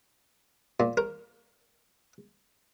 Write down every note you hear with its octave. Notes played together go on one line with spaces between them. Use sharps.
A#2
A#4